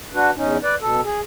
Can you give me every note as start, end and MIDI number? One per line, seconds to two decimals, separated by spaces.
0.14 0.30 62
0.14 0.30 66
0.14 0.30 71
0.36 0.57 40
0.36 0.57 61
0.36 0.57 63
0.63 0.75 71
0.63 0.75 74
0.81 1.01 47
0.81 1.01 69
1.04 1.21 68